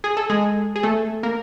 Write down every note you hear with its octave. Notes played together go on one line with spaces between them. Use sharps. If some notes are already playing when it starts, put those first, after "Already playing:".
G#4
A4
G#3 G#4
G#4
A3 A4
A#3 A#4